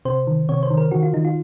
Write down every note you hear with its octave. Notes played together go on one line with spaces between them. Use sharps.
C3 C5
D#3
C3 C#5
C5
D#3
A#4
D#3 F#4
F4
D#3 D#4
F4